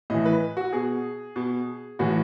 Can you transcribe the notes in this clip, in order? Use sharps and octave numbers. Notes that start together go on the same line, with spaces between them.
A2 E3 D#5
B4
F#4
B2 G#4
B2
A2 E3 F#4